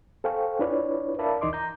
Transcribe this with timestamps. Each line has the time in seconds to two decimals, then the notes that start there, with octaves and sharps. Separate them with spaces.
0.24 A4 C5 F5 G5 G#5 C#6
0.59 D4 E4 F4 B4 C#5 D5
1.19 A#4 D5 E5 F5 A5 B5
1.41 C#2 E3 D#4 D#5 C6 D6
1.53 A#5 G6